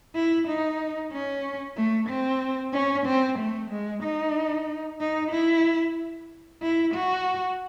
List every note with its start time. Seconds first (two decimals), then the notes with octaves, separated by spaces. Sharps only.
0.15 E4
0.48 D#4
1.12 C#4
1.76 A3
2.09 C4
2.73 C#4
3.06 C4
3.39 A3
3.71 G#3
4.03 D#4
5.00 D#4
5.32 E4
6.62 E4
6.94 F#4